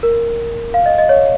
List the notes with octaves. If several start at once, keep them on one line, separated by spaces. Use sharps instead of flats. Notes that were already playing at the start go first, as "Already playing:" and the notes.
A#4
F5
D#5
D#5
C#5